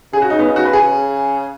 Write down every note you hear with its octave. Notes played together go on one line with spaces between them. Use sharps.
C#3 G#4
F#4
D#4
B3
D#4
F#4
B4
G#4
C#3